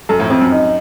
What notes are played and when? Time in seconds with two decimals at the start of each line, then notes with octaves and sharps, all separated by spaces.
0.09 F#2 A4
0.19 F2 A2
0.30 F2 C4
0.41 F#2
0.52 D#4